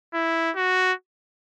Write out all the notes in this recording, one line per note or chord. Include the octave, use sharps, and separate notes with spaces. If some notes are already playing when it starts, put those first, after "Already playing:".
E4
F#4